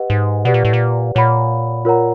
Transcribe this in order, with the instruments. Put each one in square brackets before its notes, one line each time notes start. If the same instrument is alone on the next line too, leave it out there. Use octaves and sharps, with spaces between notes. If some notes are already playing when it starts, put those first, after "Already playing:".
Already playing: [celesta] G4 B4 D#5 F#5
[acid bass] G#2
[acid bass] B2 [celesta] G4 B4 D5 F#5
[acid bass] A#2
A2
A#2
[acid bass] A#2 [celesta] C#5 F#5 B5
[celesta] F4 A#4 C#5 F#5 A#5